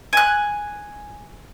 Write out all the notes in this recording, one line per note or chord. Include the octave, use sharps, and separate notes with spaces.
G#5 F#6